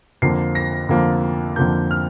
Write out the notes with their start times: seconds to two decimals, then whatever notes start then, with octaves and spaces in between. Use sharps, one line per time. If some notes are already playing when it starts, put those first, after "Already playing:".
0.22 F2 D3 F3 A#3 C7
0.55 A#6
0.89 F2 D3 F3 A#3
1.56 F2 D3 F3 A#3 G6
1.91 F6